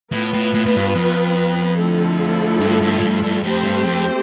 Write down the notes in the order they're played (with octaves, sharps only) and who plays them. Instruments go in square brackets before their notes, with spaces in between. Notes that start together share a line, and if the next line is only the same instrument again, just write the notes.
[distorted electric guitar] A2 [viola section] B3 F4 B4
[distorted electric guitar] A2
A2
A2
G2
F2
[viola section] D3 F3 A3 E4 A4
[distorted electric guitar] G2
G2
A2
G2
G2
[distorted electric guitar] F2 [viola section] A3 C4 G4 C5
[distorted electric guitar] G2
F2